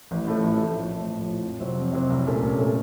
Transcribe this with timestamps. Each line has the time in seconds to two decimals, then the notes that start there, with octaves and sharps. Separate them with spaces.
0.11 A1
0.27 A2 F3 A3
0.44 A1
0.60 A2 F3 A3
0.77 A#1
0.93 A2 F3
1.10 A#1
1.26 A2 F3
1.43 F2
1.60 C3 F#3 C4
1.76 F2
1.93 C3 F#3 C4
2.10 C2
2.27 A#2 A3 C#4 A4
2.43 C2
2.59 A#2 A3 C#4 A4